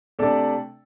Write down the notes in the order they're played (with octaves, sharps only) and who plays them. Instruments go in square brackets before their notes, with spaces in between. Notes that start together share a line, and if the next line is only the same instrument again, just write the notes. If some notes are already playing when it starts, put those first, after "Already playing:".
[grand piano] C3 A3 D4 A4 D5